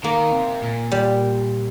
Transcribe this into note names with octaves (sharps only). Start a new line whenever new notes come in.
D#3 A#3
C3
A#2
G3